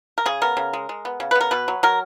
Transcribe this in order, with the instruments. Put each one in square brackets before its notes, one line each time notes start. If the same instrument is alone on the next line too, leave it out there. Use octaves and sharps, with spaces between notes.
[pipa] A#4
C#3 G#4
B3 A#4
C#3
G#3
G#3
B3
C#3
B4
B3
A#4
B2 B4
F#3
F#3 A#4